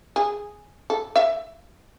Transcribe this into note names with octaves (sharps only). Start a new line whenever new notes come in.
G#4
A4
E5